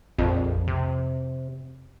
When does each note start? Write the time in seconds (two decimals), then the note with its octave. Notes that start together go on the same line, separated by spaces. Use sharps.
0.19 A#1 F2
0.67 C3